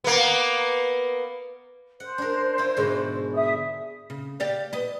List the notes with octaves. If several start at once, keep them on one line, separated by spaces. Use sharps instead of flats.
A#3 B3
C5 F#5
D4 A#4
E4 F4
G#2 B2 D3
E5 D#6
C#3
G4 D5 F5
B4 D#5